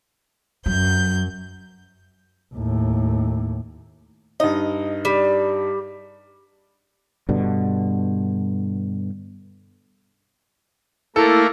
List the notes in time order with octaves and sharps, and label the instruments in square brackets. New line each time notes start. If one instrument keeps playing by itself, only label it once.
[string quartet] F#2 G6 [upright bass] F#3
[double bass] D#2 A2
[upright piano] G2 D#4 [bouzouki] D#5
[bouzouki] G3
[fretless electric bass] G2 B2 D3
[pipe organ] A3 A#3 A#4 [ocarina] E4 [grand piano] A4